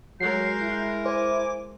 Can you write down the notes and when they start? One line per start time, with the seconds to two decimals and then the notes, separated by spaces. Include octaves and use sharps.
0.20 F#3 G#3 F#4 A#4 G6 C7
0.62 E4
1.06 C5 G#5 D6